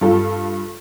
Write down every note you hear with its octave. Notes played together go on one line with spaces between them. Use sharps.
G2 F4 A4